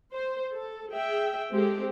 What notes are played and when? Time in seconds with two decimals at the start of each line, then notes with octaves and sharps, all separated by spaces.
0.14 C5
0.54 A4
0.93 G#4 E5 G5
1.51 G#3 C4 G4 A4